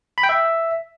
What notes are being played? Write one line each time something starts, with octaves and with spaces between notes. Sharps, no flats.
B5
G5
E5